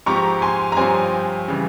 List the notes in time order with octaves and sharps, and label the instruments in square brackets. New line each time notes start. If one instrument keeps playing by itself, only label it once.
[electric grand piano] G#2 F3 C4 G4 [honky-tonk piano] A#5 C#6
[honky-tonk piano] G#5 C6
A#5
[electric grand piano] G2 F3 C4 G4 C#5 [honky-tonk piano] G#5 C6
[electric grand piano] C#3 E3 G3